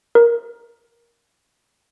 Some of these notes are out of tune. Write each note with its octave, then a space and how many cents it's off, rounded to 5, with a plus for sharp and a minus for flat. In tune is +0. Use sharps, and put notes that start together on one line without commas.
A#4 +10